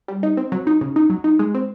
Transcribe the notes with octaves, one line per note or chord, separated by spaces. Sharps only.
G3
D#4
C4
F#3
D#4
C#3
D#4
F#3
D#4
G#3
C4